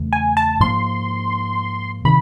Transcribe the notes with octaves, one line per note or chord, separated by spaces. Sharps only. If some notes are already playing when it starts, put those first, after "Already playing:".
Already playing: E2 C#3 E3 A3
G#5
A5
G#2 F3 A#3 C6
C3 D#3 B5